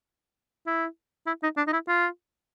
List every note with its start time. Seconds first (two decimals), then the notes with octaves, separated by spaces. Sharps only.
0.67 E4
1.26 E4
1.43 D#4
1.57 D4
1.67 D#4
1.73 E4
1.88 F4